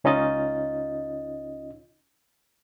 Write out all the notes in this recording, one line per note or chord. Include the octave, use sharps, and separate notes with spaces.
C#2 C#4 D#4 F4 D#5 A6